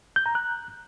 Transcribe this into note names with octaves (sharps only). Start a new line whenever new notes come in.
G6
A#5
F#6